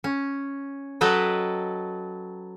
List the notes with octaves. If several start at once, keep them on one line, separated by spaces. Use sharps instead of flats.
C#4
F#3 A4 B4 D#5 G5